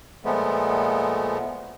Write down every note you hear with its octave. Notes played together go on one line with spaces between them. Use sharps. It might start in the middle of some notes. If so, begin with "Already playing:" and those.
A#2 F3 G#3 A3 B3